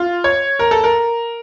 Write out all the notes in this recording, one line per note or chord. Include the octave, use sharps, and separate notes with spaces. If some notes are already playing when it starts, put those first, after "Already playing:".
Already playing: F4
C#5
A#4
A4
A#4